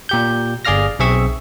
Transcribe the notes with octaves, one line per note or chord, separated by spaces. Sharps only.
A#2 G4 G6
G1 G#4 D5 F5 F6 A#6
B1 C4 G#4 E5 C#6 E6